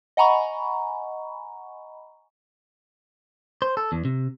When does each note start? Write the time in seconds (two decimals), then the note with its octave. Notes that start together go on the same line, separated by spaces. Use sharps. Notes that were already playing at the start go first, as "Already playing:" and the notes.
0.17 D#5 F#5 G#5 A#5 B5 C#6
3.62 C5
3.77 A4
3.92 E2
4.05 C3